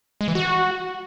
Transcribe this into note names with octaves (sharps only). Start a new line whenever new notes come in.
G#3
E3
F#4